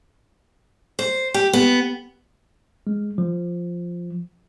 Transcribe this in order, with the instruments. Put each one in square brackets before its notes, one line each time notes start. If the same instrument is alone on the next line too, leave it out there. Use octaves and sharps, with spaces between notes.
[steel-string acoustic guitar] C5
G4
B3
[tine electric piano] G#3
F3